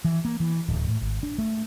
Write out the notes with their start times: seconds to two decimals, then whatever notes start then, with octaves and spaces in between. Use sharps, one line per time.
0.04 E3
0.25 A#3
0.40 E3
0.68 D1
0.87 A2
1.01 G#1
1.23 D4
1.38 A3